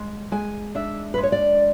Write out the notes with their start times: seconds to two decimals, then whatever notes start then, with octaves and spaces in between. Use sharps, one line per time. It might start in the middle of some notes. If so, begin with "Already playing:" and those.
Already playing: G#3
0.32 G#3 G#5
0.75 D4 E5
1.14 G#3 B4
1.23 C#5
1.32 D5